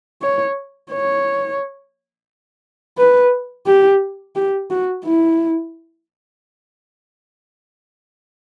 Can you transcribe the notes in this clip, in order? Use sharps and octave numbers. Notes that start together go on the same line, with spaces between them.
C#5
C#5
B4
G4
G4
F#4
E4